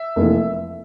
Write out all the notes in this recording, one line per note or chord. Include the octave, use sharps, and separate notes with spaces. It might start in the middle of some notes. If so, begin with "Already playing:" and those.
Already playing: E5
F1 F2 E3 A#3